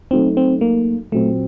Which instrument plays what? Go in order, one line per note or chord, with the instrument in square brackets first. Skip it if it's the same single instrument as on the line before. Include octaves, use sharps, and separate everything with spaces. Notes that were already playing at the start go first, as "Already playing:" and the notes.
[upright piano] F#3 A3 D#4 F#4 [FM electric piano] C4
[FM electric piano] C4
A#3
[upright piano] A#2 F#3 C4 [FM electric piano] A3